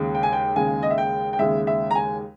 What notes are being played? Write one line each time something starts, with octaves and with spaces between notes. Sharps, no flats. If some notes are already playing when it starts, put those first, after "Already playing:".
Already playing: D#2 C#3 G#3
G5
G#5
G5
D#2 C#3 G#3 G#5
D#5
E5
G5
G5
D#2 C#3 G#3 E5
E5
A#5
G#5